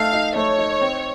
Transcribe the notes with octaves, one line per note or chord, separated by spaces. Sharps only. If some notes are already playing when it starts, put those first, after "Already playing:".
Already playing: A3 D#4 F5
D#4
A3 C#5
D#4
C4